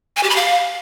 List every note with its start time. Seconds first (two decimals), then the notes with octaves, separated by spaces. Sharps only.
0.17 G#5
0.23 G4
0.30 B5
0.36 F5